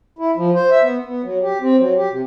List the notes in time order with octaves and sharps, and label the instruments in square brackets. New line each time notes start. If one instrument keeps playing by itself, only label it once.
[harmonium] E4
F3
C5
E5
B3
B3
F#3
G4
C4
F#3
G4
C3